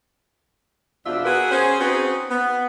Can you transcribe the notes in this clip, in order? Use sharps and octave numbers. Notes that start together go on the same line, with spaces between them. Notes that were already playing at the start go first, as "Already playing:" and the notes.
E2 B2 C4 D4 F4 E5
B3 F#4 G#4 A#4 B4
C#4 G#4 C5
C4 C#4 D#4 F#4 G#4 B4
B3